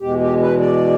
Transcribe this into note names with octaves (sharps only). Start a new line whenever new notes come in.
E2 B2 G#3 G4
G4
B4
D5